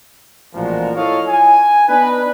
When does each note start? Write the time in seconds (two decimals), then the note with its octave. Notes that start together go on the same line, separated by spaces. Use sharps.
0.54 A1 A#2 F3 G#3 F#4 A#4
0.95 E4 F4 A4 C#5 D#5 F5
1.28 G#5
1.89 B3 D4 D#4 B4